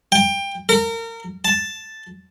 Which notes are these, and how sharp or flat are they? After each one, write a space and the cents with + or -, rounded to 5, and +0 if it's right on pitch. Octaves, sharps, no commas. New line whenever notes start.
G5 +20
A#4 -30
A5 +0